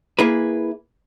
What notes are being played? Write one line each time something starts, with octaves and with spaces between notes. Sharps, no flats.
A#3 E4 G#4 B4